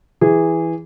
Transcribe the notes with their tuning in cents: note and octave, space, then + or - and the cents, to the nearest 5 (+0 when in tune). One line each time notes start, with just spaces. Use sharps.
E3 +0 G#4 -15